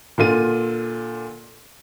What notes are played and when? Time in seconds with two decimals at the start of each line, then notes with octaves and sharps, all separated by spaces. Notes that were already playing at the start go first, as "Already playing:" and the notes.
0.18 A#2 D3 F4 D#7